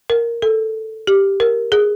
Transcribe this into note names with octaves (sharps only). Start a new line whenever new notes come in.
A#4
A4
G4
A#4
G#4